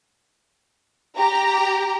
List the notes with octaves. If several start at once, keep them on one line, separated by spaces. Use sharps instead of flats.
G4 A#5